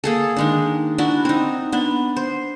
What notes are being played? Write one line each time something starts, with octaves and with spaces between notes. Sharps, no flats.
A#3 G#4 A4
D#3 G#3 D4
D4 E4 F#4
C4 D#4
B3 D4
C5